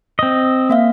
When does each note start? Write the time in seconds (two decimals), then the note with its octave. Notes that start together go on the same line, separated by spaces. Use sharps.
0.19 C4 D#5
0.69 A#3 E5 F5